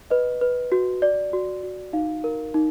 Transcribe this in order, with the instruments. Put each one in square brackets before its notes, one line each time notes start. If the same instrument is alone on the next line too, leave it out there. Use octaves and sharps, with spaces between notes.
[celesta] B4 D#5
B4
F#4
D5
F#4
F#4
D#4 F5
A#4
D#4